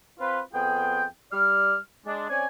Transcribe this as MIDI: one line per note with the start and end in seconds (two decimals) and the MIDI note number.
0.20 0.40 60
0.20 0.40 65
0.20 0.40 71
0.53 1.04 41
0.53 1.04 59
0.53 1.04 65
0.53 1.04 68
0.53 1.04 79
1.32 1.77 55
1.32 1.77 74
1.32 1.77 89
2.06 2.28 56
2.06 2.28 62
2.30 2.46 60
2.30 2.46 61
2.30 2.46 73
2.30 2.46 74
2.30 2.46 80